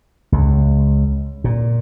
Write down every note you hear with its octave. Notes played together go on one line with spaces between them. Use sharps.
C#2
A#2